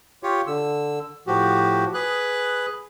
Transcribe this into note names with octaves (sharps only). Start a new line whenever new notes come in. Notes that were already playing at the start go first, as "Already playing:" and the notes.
F4 G4 C#5
D3 E6
A2 F3 F#4 G4
G#4 B4 F#6